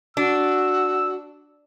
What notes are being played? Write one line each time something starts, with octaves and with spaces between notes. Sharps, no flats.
D4 F#4 E6